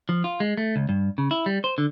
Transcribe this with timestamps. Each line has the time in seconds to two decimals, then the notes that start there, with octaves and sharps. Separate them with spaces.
0.09 F3
0.24 F4
0.40 G#3
0.57 A3
0.76 C#2
0.89 G2
1.18 C#3
1.31 E4
1.46 G3
1.64 C5
1.78 D3